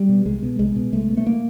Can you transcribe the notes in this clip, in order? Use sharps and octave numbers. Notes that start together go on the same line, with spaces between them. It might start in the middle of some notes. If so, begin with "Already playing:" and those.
Already playing: G3
B2
C2 G#3
B2
C2 G#3
B2
C2 A3
B2
A3
A#3